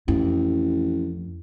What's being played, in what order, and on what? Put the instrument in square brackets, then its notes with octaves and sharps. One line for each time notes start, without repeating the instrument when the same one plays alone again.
[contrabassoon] A1 [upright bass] F2